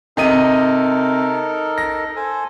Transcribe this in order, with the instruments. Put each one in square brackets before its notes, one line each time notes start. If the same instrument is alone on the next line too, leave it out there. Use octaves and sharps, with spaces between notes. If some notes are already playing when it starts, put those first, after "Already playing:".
[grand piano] C3 D#5 D#7 [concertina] D#4 A4 A#4
[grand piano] A#6
[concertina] A4 C5 G#5